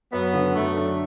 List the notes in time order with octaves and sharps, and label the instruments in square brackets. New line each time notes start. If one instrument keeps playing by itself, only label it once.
[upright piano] F#2 [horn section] B3
[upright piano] D3
[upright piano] F#2 [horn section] A3
[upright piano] D4